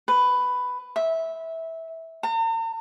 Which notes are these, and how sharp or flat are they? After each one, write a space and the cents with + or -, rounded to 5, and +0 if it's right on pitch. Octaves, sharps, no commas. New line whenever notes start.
B4 +10
E5 -15
A#5 -45